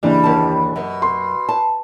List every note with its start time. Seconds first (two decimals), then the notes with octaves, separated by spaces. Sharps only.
0.03 F#1 E3 G3 D4
0.24 D#2 A5
0.76 F#2 B2
1.02 C6
1.49 A5